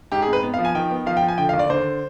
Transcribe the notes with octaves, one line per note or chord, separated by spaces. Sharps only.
G#2 G4
G#4
C4
B4
B3
F5
F3
G#5
D#3 G5
B3
F3 F5
G5
F3
G#5
D3 G5
F5
D#2
D5
D3 C5